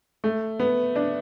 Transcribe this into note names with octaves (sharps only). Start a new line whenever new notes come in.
A3
B3
D4